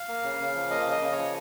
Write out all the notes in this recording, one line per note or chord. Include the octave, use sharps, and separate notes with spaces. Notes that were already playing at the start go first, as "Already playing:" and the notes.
Already playing: F5
A#3
C#3
C#3
F3
A#3 D#5
C#3
D#5
C#3
C#5
F3